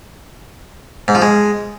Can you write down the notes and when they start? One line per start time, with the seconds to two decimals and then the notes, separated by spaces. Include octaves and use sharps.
1.08 G#2
1.15 F3
1.22 G#3